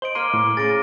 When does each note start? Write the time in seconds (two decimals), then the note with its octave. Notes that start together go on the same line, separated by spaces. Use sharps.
0.02 C5 D#5 D7 F#7 G7
0.15 A#3 C6 F6 D#7
0.34 A2
0.57 C#3 G#4 D5 A6 A#6 D7